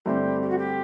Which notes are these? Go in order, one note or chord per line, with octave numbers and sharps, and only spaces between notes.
G2 D3 A3 C4 E4 G4
G4
F#4
G4